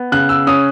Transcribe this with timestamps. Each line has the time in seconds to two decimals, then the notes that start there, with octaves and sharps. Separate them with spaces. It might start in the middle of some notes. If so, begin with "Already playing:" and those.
Already playing: B3
0.12 C#3 F#6
0.29 E6
0.47 C#4 D#6